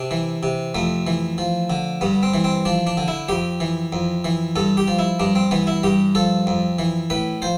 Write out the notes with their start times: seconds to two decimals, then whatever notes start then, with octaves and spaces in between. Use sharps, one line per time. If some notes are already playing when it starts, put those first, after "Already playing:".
Already playing: C3 D4
0.11 E3
0.43 C3
0.75 F2 A3
1.07 E3
1.38 F3
1.70 D3
2.01 G2 B3
2.23 C4
2.34 E3
2.44 C4
2.65 F3 D4
2.87 D4
2.97 D3
3.08 E4
3.29 F2 G4
3.60 E3
3.93 F2
4.25 E3
4.56 G2 A4
4.77 G4
4.88 F3
4.99 E4
5.19 G2 D4
5.35 C4
5.51 E3 B3
5.67 E4
5.83 G2 G4
6.15 F3 A4
6.47 F2
6.79 E3
7.10 A2 B4
7.42 F3 C5